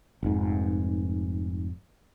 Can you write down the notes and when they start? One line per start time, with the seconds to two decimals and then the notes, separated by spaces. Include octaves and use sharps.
0.23 F1 G#2